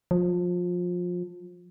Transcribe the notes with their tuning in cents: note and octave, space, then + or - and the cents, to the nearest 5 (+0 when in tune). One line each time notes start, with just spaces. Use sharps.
F3 +25